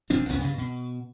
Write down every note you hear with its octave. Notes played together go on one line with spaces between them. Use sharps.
D#1 F3 C4 D4
C2 F2 B3 C#4
G2 C#3
B2